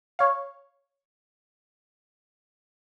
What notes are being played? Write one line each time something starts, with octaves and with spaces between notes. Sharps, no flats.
C#5 F5